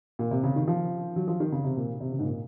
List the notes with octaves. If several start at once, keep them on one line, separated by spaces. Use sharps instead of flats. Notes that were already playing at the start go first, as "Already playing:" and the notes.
A#2
C3
C#3
D#3
F3
F#3
F3
D#3
C#3
C3
A#2
C3
C#3
G#2
A#2